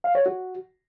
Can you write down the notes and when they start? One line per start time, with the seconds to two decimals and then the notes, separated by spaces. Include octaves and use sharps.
0.04 F5
0.15 C#5
0.26 F#4